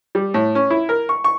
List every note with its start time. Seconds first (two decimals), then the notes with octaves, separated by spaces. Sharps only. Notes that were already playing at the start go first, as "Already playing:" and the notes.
0.15 G3
0.34 A2
0.55 C#4
0.70 E4
0.89 A#4
1.09 C#6
1.24 C#6